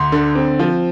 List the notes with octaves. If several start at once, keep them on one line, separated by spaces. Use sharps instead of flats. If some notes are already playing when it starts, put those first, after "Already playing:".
Already playing: D2 C6
D3
C4
F3